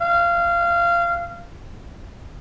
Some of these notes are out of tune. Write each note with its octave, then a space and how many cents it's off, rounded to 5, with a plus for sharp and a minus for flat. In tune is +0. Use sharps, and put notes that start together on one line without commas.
F5 -20